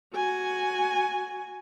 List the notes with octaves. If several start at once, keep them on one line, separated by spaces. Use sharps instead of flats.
F#4 G#5